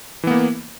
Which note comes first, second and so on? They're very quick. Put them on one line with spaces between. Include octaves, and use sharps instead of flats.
E3 B3 A#3